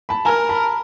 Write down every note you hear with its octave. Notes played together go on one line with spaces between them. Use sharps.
A5 B5
A#4 G#5 A#5
A5 B5